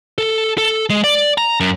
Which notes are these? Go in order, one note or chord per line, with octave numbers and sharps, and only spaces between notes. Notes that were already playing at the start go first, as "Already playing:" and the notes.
A4
A4
G#3
D5
A#5
F#2